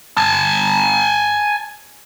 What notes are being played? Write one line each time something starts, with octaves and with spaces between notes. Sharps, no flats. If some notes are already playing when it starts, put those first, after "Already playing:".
G#5 A5